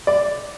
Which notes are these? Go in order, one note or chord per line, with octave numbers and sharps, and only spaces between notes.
D5